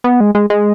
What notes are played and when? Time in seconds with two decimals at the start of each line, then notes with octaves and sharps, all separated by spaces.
0.04 B3
0.20 G#3
0.35 G#3
0.50 G#3